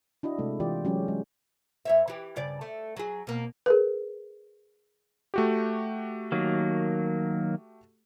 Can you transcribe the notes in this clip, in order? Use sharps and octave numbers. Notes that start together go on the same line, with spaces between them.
D4 E4 F#4 D#5
C3 G#3 A3
E3 F4 G4 D5
F#3 G#3 C#4 G4
G#3
F#2 C#5 E5
E3 G4
G2 C#3 D5
A3
F#3 G#4
B2 A#3
G#4 A#4 B4
A3 F#4 G4
D#3 F#3 A#3